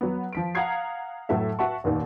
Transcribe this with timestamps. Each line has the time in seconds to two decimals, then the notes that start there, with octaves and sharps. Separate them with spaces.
0.01 F#3 B3
0.33 F3 B6 D7
0.55 F5 F#5 A#5 D#6 G#6 C7
1.29 A2 F#3 A3 A4 E5
1.59 F#4 E5 F#5 A5 C#6
1.84 A1 D#2 A#2 D#3